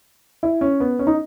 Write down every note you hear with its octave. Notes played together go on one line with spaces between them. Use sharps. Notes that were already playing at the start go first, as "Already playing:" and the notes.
E4
C#4
B3
C#4
D#4